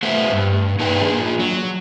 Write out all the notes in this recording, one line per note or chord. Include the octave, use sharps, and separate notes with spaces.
A3 B4 C5 E5 F5
G2
A#3 D#4 B4 F5 G5
A#3 D4 G#4
F#3